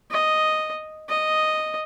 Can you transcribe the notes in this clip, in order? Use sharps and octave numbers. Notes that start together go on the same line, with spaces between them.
D#5
D#5